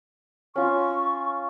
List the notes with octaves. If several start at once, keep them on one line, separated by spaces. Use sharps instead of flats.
C#4 F4 C#6